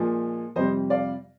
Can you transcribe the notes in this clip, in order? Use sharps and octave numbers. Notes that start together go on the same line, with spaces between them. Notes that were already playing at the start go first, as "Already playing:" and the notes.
Already playing: A#2 F3 G#3
F2 C3 G3 C5 D#5
D5 F5